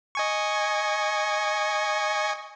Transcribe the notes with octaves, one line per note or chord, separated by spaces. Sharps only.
D#5 G#5 C#6